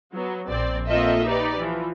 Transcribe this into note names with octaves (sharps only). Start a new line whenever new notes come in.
F#3 B3
A#1 C4 D5
A#3 C4 F4 A4 D#5 E5
D#4 G4 B4 D5
E3 F3